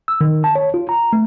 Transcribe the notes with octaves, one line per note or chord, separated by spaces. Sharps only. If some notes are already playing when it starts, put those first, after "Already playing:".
E6
D#3
A5
C#5
F4
A#5
A3